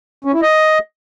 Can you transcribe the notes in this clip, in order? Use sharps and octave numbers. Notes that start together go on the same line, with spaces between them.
C#4
E4
D#5